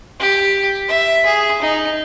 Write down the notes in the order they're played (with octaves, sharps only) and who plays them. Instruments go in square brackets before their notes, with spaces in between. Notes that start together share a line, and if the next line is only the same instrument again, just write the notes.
[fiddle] G4
E5
G#4
D#4